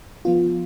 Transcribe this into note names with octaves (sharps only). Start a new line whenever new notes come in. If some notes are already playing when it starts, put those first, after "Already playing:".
F3 B3 F4